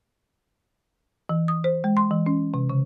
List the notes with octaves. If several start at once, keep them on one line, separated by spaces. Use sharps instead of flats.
E3
D#6
C5
G#3
C6
E3
C#4
C3
C#3